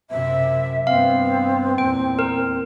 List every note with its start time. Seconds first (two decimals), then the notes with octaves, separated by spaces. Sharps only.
0.10 F#2 C3 E5
0.87 G2 B3 C4 F5
1.78 E2 A#2 G5
2.19 A#4